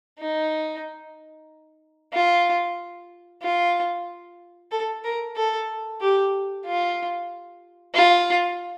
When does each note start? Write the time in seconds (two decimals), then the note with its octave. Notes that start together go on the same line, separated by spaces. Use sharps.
0.20 D#4
2.13 F4
3.43 F4
4.71 A4
5.04 A#4
5.36 A4
6.01 G4
6.66 F4
7.94 F4